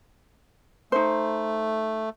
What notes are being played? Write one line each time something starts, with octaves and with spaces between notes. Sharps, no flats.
A3 D#4 C5